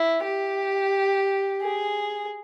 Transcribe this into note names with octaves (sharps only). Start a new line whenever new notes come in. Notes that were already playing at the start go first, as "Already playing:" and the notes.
Already playing: E4
G4
G#4